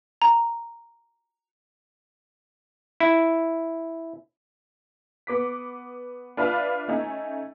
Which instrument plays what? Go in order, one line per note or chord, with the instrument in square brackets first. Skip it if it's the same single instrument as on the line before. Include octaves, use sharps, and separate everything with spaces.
[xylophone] A#5
[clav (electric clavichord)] E4
[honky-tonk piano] B3 D6 B6
D4 F4 B4 E5 F5 A5
A3 C#4 D#4